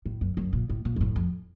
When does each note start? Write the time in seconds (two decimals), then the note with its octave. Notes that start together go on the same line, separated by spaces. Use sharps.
0.06 A2
0.21 F#2
0.37 F#2
0.53 A#2
0.69 A2
0.85 A#2
0.96 F#2
1.01 A2
1.16 F2